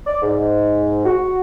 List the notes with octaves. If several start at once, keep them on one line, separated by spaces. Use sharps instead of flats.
D5
G#2
F#4